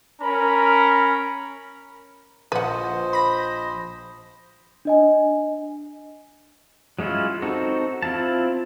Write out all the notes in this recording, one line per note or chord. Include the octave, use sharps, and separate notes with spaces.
C#4 A#4 A#5 B5
A#1 B4 C5 D#5 F#5
B5 A#6
D4 D#5 G#5
F#3 G#3 C#4 E4 F4
C4 D#4 F#4 A4
C4 E4 F4 A5